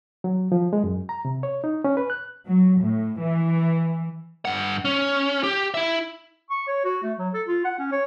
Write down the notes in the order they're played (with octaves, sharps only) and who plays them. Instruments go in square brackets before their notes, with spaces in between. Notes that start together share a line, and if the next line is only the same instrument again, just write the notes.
[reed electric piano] F#3
F3
G#3
F#2
A#5
C3
C#5
D#4
C#4
B4
F#6
[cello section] F#3
A2
E3
[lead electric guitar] G2 F#5
C#4
G4
E4 E5
[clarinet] C#6
C#5
F#4
A3
F#3
A4
F4
F#5
C#4
C#5